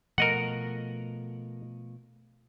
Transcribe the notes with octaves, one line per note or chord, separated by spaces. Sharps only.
B2 F3 A3 A#4 D#5 F#5